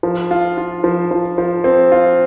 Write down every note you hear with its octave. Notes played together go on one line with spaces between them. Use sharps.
F3
F4
F4
F3
F3
F3
C4
F4